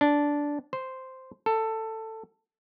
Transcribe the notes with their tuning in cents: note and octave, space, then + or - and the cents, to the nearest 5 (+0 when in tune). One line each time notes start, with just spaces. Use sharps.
D4 -10
C5 -5
A4 +15